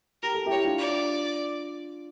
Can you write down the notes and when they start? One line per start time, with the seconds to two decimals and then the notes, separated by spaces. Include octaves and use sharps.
0.23 G4 A#4
0.35 A4
0.46 E4 G4 C#5
0.65 D4 F4
0.79 D5